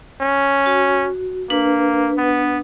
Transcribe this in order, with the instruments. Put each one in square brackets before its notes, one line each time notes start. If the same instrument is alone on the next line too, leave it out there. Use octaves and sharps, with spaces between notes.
[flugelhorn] C#4
[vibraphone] F#4
[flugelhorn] A#3 [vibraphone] D4 B4
[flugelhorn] B3